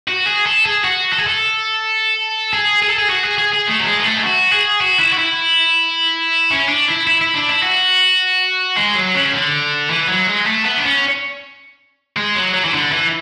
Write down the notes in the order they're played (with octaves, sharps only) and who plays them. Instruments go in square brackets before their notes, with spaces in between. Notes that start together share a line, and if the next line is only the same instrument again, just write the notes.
[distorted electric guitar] F#4
G#4
A4
G#4
F#4
A4
G#4
A4
G#4
G#4
A4
G#4
F#4
G#4
G#4
G#4
A3
F#3
G#3
B3
A3
G#4
F#4
G#4
F#4
E4
F#4
E4
C#4
D4
E4
E4
E4
D4
E4
F#4
G#3
F#3
C#3
D3
E3
F#3
G#3
A3
B3
D4
C#4
G#3
F#3
F#3
E3
D3
E3